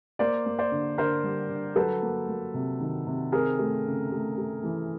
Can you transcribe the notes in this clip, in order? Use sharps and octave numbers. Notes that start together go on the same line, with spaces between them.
A#3 C5 D5
A#3
C5 D5
D3
D3 A#4 C5
G3
D3
F#3 A4 B4
A#3
A#3
C3
D#3
C3
C4 G#4 A#4
A3
C#3
A3
A3
E3